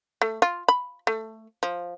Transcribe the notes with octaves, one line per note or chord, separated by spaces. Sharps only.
A3
F4
B5
A3
F3